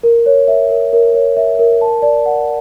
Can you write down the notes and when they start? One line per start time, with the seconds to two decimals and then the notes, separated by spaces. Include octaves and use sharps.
0.03 A#4
0.26 C#5
0.48 E5
0.70 A#4
0.93 A#4
1.14 C#5
1.37 E5
1.59 A#4
1.81 A5
2.02 D5
2.26 F#5